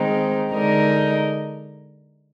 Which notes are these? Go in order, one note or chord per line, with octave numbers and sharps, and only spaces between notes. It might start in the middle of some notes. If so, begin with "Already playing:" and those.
Already playing: D#3 G#3 C4 D#4
D3 G#3 D#4 A#4 D#5